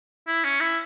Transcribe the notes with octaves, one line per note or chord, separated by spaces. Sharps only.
E4
C#4
E4